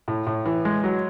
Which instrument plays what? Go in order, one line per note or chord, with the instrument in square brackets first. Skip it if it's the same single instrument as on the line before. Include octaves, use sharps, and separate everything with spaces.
[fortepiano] A2
A2
E3
G#3
F#3